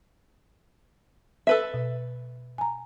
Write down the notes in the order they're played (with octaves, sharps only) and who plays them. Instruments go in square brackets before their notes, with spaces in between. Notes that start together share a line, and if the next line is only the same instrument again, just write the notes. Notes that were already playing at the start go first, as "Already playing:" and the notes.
[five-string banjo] A4 B4 E5
[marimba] B2
G#5 A#5